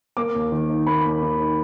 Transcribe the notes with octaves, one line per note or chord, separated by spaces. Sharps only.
A#3 D6
D#2
D#3
D#4
A#3 B5
D#2
D#3
D#4